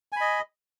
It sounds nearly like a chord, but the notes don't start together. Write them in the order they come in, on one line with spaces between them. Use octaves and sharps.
G#5 B5 D#5